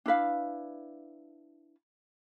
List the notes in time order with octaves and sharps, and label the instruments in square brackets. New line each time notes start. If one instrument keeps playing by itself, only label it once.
[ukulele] D4 E4 B4 F5